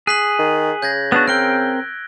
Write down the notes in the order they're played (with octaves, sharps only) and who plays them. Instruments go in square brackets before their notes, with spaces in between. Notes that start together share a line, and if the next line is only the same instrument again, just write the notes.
[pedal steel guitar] G#4 [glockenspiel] F#6 B6 F#7
[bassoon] D#3
[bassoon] C#3 [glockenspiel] G6 G#6 A#6
[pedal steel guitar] B3 D4 F#4 [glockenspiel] E6
[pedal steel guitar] C4 A#4 G5 [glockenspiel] F#6 D7 G7